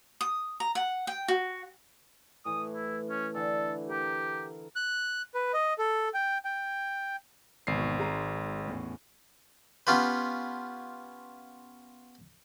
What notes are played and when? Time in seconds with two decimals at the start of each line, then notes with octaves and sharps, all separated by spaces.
0.21 D#6
0.60 A#5
0.75 F#5
1.07 G5
1.28 F#4
2.45 A2 E3 D#6
2.73 E4
3.10 C#4
3.35 D3 E3 A4
3.89 G4 A#4
4.76 F#6
5.34 B4
5.54 D#5
5.78 A4
6.14 G5
6.45 G5
7.67 G#1 E2 B2 C7
8.00 G#3 A#5 D#7
8.65 E2 A2 C#4
9.87 B3 C#4 F4 G4 B4